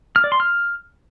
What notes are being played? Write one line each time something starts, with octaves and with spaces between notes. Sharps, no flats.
F6
D5
C6
F6